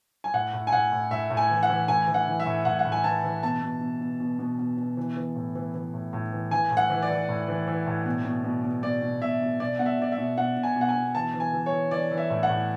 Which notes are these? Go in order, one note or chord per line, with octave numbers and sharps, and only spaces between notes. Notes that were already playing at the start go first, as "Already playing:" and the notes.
G#5
A2 F#5
A2
G#5
A2 F#5
A2
A2 E5
A2
G#5
E3
F#5
E3
A2 G#5
E3
F#5
E3
E5
A2
A2 F#5
F#5
A2
G#5
E3 A5
E3
B2 A5
B2
B2
B2
B2
B2
B2
B2
E3
E3
A2
E3
E3
A2
A2
E3
E3 G#5
A2
F#5
E3
D5
E3
A2
E3
E3
A2
B2
B2
B2
B2
B2 D5
B2
B2 E5
B2
B2 D5
B2 F#5
E5
B2 D5
E5
B2
B2 F#5
B2
G#5
B2
F#5
G#5
B2
E3 A5
E3
G#5
E3
C#5
E3
E3 D5
E3
E5
A2
F#5
A2